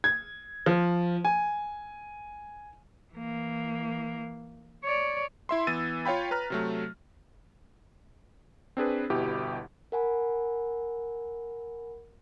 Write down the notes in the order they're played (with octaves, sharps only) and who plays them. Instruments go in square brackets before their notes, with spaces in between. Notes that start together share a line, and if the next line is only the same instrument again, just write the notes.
[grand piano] G#6
F3
G#5
[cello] E3 A#3
C#5 D5
[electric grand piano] E4 E5 C6
E3 B3 E6 A6 D#7
F4 C#5 F5 G5 B5
B4 A#5 F6
C3 F#3 A3
C4 D4 G#4 B4
G1 B2 E4 G4
[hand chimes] A#4 F#5 G#5 B5